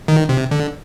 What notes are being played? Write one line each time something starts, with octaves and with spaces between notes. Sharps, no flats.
D#3
C3
D3